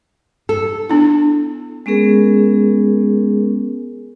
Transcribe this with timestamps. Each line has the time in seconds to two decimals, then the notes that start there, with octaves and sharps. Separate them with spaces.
0.49 A4
0.89 B3 D4 E4
1.86 G#3 B3 C#4 G#4 A#4